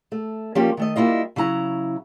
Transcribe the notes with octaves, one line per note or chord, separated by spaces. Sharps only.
A3
F3 G3 A#3 C#4 G4
D#3 A3 D#5
G3 A#3 E4 F4 D#5
C#3 F#3 E4 A#5